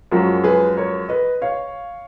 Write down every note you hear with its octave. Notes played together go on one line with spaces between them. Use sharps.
F#2 F3 G#3 F#4 A#4
G#4 B4
A#4 C#5
B4 D#5
C#5 F5